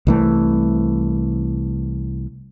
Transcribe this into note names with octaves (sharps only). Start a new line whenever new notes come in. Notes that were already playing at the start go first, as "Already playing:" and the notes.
C2 E3 A3